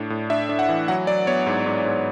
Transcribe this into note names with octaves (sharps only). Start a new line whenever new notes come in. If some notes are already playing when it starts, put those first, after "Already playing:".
Already playing: A2 D4
A2
D4 E5
D4
F#5
E3
F#3 F#5
F#3 D5
B3 C#5
G#2
G#2
G#2